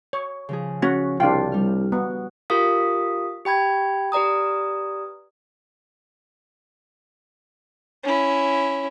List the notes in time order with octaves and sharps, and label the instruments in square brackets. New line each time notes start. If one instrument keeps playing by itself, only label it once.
[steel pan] C#5
[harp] C#3 F3 G#4
[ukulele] C#4 [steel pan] F#4
[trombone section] C2 [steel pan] D4 F4 [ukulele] G5
[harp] G3 F6
[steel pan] B3 [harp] F#4
[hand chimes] F4 G4 A#4 F5 D#6 B6
G4 G5 B5 G#6
G4 B4 D5 A#5 D#6
[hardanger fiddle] C#4 E4